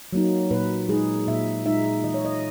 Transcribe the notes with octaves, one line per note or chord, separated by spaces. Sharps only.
F#3 A#3 D#4
A#2 B4
G#3 D#4 G#4
A#2 E5
G#3 D#4 E5
E3 D#5
C#5
D#5